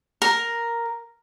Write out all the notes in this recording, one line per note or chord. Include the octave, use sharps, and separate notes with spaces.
A#4